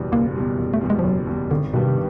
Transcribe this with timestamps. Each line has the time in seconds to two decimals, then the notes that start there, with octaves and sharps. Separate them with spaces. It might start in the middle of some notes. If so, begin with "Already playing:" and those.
Already playing: F#1 E2 B2 G3
0.12 F#1 A#3
0.36 E2 B2 G3
0.59 F#1
0.74 A3
0.81 E2 B2 G3
0.90 G#3
0.99 F3
1.04 F#1 F#3
1.27 E2 B2 G3
1.50 G#1 D3
1.73 G2 B2 D#3 G3 B3
1.84 C3